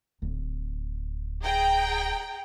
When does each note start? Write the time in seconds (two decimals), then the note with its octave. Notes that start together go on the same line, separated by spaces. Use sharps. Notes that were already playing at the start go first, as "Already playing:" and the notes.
0.22 D1
1.42 G#4 G5 A#5